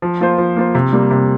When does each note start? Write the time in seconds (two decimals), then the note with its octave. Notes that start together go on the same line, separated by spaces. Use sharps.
0.02 F3
0.20 A#3 F4 C5
0.38 F3
0.56 A#3 F4 C5
0.75 C3
0.93 G3 A#3
1.11 C3